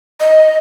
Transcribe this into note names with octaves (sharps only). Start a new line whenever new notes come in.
D#5